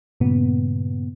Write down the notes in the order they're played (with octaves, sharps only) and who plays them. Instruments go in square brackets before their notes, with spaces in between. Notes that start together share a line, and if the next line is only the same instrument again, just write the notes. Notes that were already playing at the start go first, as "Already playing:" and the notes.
[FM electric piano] G2 A#2 C#3 B3